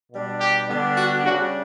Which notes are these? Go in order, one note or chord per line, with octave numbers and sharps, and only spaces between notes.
B2 G3 D4
G4
D3 G3 B3 D4
F#4
C#3 G3 D4 F#4